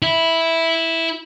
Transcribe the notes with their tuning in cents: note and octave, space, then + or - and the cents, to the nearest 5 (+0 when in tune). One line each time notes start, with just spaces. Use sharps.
E4 -5